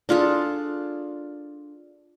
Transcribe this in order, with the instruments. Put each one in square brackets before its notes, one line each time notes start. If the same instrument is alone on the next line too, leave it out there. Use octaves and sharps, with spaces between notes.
[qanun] D4 F4 G#4 A4